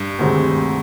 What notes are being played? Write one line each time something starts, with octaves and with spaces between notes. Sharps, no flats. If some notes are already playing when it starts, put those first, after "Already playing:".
Already playing: G2
D2 C3 D#3 G#3 C4